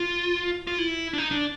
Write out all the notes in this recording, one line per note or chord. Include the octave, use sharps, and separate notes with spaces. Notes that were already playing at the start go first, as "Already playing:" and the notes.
Already playing: F4
F4
E4
D4
D#4
D4